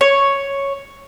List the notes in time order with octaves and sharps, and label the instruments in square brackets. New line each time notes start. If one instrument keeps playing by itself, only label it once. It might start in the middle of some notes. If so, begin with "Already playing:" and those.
[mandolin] C#5